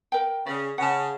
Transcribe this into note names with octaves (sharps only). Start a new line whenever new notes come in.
A#4 G5
C#3 D5
C#3 F#5 A5